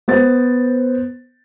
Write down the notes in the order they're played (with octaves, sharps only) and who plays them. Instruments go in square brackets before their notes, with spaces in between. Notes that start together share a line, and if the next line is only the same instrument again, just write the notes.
[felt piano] B3 C5 A6